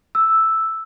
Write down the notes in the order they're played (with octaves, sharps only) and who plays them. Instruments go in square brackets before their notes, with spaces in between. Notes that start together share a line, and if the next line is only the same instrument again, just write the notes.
[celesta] E6